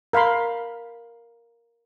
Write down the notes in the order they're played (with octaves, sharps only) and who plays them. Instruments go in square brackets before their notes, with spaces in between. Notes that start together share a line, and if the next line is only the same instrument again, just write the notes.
[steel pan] A#4 F5 B5 C6